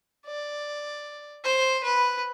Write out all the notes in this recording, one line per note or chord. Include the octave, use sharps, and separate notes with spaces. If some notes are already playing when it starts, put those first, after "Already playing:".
D5
C5
B4